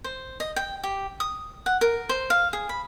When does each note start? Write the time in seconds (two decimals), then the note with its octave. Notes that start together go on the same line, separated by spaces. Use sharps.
0.04 C5
0.40 D#5
0.56 G5
0.84 G4
1.20 D#6
1.66 F#5
1.81 A#4
2.09 C5
2.30 F5
2.53 G#4
2.69 B5